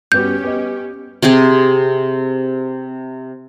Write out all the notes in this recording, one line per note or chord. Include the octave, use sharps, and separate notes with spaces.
G2 B3 C#4 F#4 G4 G6
B3 D#5
C3 C4 G4 G#4